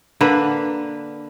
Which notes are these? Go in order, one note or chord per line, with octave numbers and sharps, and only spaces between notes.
D3 A#3 B4